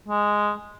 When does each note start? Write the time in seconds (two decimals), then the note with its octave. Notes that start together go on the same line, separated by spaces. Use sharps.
0.08 G#3